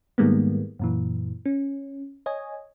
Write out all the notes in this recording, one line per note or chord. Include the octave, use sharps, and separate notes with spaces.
G#2 D#3 G3 G#3 A#3 B3
F#2 A#2 E3
C#4
C#5 D#5 G#5